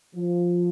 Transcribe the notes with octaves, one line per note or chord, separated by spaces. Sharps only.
F3